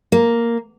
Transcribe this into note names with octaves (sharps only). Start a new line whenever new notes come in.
A#3